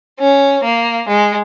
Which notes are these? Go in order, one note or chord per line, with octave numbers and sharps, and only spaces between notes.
C#4
A#3
G#3